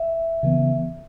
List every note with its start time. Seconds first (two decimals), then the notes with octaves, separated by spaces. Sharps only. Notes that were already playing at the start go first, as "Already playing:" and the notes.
Already playing: E5
0.43 C#3 E3 B3